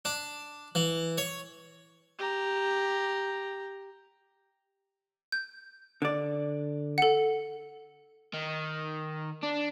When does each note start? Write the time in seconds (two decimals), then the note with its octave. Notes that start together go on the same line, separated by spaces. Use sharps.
0.05 D4
0.75 E3
1.18 C#5
2.19 G4 A#5
5.32 G6
6.02 D3 D5
6.98 A4 F#5
8.34 D#3
9.43 D4